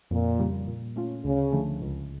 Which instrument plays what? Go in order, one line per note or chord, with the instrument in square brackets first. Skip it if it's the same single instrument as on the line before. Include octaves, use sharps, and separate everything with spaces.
[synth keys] F2 [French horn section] A#2
[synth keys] C#3 G3
A#2
A3 C#4 F4
[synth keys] D2 [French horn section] C#3
[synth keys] D3 F3 A3
C#2